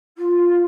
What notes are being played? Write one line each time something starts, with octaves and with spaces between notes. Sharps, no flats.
F4